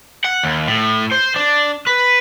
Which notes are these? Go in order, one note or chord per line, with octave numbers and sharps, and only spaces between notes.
F#5
D#2
A2
C5
D4
B4